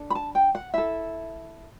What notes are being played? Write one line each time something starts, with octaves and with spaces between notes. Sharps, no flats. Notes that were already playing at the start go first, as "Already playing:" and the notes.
Already playing: D4 A4
B5
A5
G5
F#5
E4 A4 E5